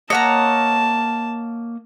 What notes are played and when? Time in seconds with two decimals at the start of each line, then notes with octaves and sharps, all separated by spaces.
0.10 A#3 C#5 D#5 F#5 A5 A#5